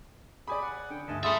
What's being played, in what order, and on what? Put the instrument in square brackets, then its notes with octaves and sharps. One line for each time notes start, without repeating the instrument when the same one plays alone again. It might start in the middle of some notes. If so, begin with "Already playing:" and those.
[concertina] G4 G#4 [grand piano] D5 G#5 B5
[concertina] F#5
[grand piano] D3 [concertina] G5
[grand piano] D2 G2 [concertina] D#5 G#5 A5
[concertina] F4 G#4 D#6 [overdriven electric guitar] A4 E5 [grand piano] B5 C6 A6